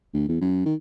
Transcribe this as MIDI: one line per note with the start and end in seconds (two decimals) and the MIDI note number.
0.14 0.28 38
0.29 0.41 40
0.41 0.66 42
0.66 0.75 51